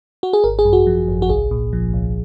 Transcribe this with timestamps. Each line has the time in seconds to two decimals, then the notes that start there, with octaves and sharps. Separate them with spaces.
0.23 F#4
0.33 G#4
0.44 G#1 A#4
0.59 G#4
0.65 F#2
0.73 F#4
0.87 F3
1.08 G#1
1.22 F#4
1.30 C2 G#4
1.51 A#2
1.73 F3
1.94 C2